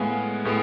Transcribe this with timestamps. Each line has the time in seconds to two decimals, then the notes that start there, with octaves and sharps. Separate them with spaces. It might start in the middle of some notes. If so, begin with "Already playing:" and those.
Already playing: A2 G#3 B3 F5 G#5
0.45 A2 G#3 B3